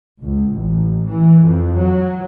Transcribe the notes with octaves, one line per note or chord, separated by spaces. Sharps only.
C#2
A1
E3
F2
F#3